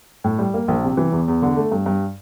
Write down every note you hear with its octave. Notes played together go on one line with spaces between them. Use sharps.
A2
G3
A#3
A#1
C3
E3
E2
E2
D3
A3
G2
G2